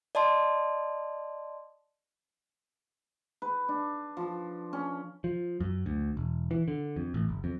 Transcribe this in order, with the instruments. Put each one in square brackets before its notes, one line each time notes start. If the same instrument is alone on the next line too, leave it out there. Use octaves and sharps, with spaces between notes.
[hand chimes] D5 D#5 A5 C6
[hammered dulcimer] B4
D4
F3
C#4
[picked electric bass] F3
F#2
D2
E1
E3
D3
F2
A1
F#1
F2